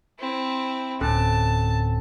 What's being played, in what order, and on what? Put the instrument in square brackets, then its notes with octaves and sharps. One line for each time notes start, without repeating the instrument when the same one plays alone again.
[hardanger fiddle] C4 E4
[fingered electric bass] D1 [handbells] C4 C#4 A4 [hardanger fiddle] A5